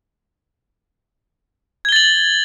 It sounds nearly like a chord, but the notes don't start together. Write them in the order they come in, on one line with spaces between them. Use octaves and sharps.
G#6 G7 A6 F#7